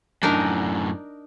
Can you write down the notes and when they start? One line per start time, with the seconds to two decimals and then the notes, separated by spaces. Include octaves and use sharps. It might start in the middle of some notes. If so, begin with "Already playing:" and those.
0.23 F#2 A2 D4 D#4 A#4